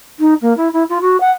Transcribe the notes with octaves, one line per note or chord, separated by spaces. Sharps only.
D#4
A#3
E4
E4
F4
F#4
F#5